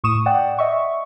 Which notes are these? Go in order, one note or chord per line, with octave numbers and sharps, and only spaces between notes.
A2 C#6 D#6 E7
D5 F#5 G5
D#5 E5 C#6